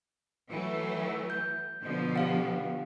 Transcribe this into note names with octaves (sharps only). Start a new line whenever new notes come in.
E3 F#3 A3
G6
B2 D3 F3
G4 F5 F#5